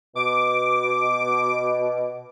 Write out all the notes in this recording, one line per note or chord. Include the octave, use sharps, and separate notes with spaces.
B2 D6